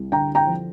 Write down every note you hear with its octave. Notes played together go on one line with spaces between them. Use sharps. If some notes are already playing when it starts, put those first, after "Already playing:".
Already playing: C2
D3 G5 A#5
G5 A#5
F3